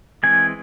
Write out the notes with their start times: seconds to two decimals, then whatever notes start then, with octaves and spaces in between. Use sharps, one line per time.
0.23 E3 G#3 C4 G#5